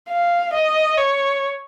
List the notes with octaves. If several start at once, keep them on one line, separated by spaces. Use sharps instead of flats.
F5
D#5
C#5